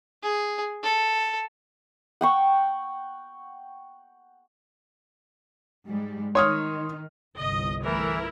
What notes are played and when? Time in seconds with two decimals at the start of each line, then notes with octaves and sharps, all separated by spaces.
0.23 G#4
0.83 A4
2.21 F#5 G5 C#6
5.87 G#2 G3 G#3
6.35 D#3 D#4 C#5 C6 D#6 F6
7.38 G1 C2 D#5
7.84 E3 A3 E4 A#4